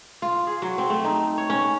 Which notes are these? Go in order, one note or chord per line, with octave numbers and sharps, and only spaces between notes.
F4
G#4
F#3
C4
A3
D#4
C#5
C#4